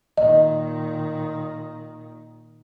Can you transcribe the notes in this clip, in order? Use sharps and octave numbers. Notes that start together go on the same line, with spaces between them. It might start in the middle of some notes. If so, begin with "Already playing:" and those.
A#2 D#3 D#5